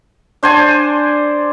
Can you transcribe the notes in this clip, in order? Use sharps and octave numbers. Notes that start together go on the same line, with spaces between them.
D4 C5 D5 G#5